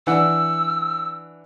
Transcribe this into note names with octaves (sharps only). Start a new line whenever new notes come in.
E3 D4 F#5 E6